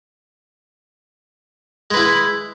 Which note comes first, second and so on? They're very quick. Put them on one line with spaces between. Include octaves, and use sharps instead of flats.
G#3 B4 E4